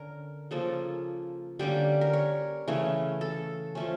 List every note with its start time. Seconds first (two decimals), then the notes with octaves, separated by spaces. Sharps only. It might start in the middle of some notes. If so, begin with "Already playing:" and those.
Already playing: D3 C#4 A#4
0.51 C#3 F3 A#3 A4
1.59 D3 G3 A#3 C#4 G4
2.01 A#4
2.13 C#5
2.68 C#3 E3 A3 C#4
3.21 A4
3.75 F3 A3 C#4